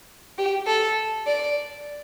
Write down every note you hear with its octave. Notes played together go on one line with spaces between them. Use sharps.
G4
A4
D5